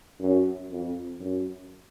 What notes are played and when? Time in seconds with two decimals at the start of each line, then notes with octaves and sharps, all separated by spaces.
0.20 F#2
0.71 F2
1.20 F#2